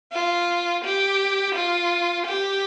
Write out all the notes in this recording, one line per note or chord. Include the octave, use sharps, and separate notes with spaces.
F4
G4
F4
G4